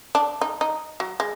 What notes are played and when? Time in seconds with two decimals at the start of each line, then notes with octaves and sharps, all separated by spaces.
0.15 D4
0.41 D#4
0.61 D#4
1.00 F#3
1.20 G#3